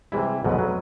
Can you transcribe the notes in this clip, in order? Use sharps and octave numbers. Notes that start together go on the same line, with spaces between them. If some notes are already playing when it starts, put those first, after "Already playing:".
C3 E3 G3 G#3 E4
F1 B1 G#2 B2 B4
F#3